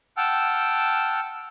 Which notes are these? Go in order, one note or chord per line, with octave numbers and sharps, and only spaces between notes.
F#5 G5 A5 E6 F6